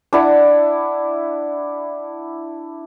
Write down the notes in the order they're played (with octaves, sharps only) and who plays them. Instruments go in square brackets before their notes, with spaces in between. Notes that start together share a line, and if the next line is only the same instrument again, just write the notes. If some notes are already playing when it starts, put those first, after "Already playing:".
[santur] D4 E4 F#5